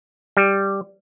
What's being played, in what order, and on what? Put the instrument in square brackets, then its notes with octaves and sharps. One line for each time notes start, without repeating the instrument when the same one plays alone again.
[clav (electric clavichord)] G3